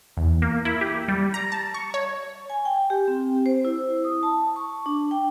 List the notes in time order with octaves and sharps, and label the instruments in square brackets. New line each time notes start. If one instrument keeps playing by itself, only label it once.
[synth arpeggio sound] E2
A#3
E4
G4
G3
A#5
A5
C#6
C#5
[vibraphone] G#5
G5
G4
C4
C5
E4
D#6
A5
C#6
D4
G5